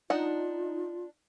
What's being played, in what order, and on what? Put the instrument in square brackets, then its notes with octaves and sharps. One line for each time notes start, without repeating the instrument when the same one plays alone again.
[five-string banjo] D4 F#5 [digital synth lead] D#4 [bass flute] F4